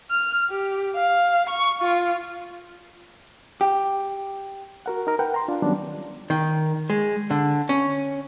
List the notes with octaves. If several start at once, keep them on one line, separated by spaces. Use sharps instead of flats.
F6
G4
F5
C#6
F4
G4
F#4 A#4 F#5
D#4 A#4
A#4 B4 F#5 G5
A#5 C6
D4 F4
D#3 F#3 G3 B3 C#4 D4
D#3
G#3
D3
C#4